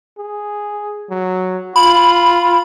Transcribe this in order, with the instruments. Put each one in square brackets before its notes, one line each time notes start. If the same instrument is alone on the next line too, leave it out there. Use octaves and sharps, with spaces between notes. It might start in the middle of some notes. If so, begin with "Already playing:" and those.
[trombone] G#4
F#3
[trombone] F4 [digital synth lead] B5